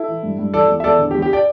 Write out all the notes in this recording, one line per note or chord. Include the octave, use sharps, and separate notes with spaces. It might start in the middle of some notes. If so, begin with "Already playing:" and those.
Already playing: E4 A4
E3
G2
G2
E3 A4 D5
E2
E5
E2 A4 D5
D3
G4
E2
G4
D5 G5